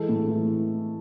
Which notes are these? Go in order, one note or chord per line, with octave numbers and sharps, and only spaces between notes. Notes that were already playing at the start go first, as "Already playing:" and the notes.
Already playing: E3 G#3 A4
A2
E3